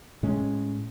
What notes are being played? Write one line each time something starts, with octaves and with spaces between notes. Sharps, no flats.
A2 G#3 C#4